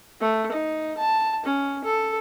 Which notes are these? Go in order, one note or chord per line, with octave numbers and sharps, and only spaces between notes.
A3
D#4
A5
C#4
A4